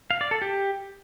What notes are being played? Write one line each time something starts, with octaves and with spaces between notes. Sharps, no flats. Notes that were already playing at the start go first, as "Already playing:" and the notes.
F5
D5
A4
G4